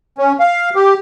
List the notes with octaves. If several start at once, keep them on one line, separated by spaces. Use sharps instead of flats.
C#4
F5
G4